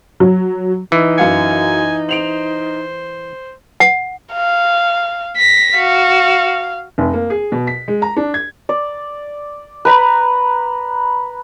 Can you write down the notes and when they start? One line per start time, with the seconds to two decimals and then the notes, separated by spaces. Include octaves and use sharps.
0.20 F#3
0.92 E3 D#4
1.18 F#2 F5 G#5 C#7
2.09 C5 D7 F7 F#7
3.80 F#5
4.33 F5
5.36 A#6 B6
5.77 F#4 F5
6.98 F1
7.13 A#3
7.30 G#4
7.52 B2
7.67 B6
7.88 G#3
8.02 A#5
8.16 D4
8.34 G#6
8.69 D5
9.85 B4 A#5 B5